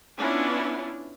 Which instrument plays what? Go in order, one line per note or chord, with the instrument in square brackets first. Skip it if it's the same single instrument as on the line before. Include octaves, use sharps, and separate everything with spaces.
[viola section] B3 C#4 D4 E4 F4